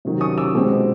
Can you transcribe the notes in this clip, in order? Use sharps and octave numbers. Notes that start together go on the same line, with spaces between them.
C3 D#3 F#3
C#6 D#6
D6 E6
B2 G#3 C4